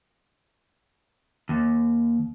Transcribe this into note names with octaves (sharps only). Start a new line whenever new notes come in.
D#2